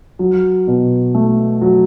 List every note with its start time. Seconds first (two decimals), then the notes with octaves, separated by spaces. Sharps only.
0.19 F#3
0.67 B2
1.14 A3
1.61 F#3